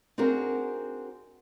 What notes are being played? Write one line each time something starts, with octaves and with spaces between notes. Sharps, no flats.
C4 D4 D#4 F#4 G#4 A#4